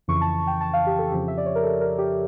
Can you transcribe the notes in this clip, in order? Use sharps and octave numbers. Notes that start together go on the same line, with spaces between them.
F2 C#3 E3 C#6
A5
G5
A5
F5
G4
A4
F2 C#3 F3 G4
E5
D5
C#5
A#4
A4
A#4
G4